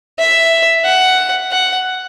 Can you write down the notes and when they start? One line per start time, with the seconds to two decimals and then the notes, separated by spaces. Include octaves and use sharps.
0.19 E5
0.85 F#5
1.51 F#5